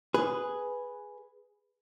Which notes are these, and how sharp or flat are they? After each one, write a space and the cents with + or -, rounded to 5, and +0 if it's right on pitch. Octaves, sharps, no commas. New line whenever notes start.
G#4 +0 B4 +0